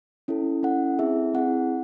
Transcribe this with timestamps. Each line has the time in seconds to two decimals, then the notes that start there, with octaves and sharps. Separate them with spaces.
0.28 C#4 E4 A4
0.63 C#4 E4 A4 F#5
0.99 C4 E4 G#4 E5
1.34 C4 E4 G#4 F#5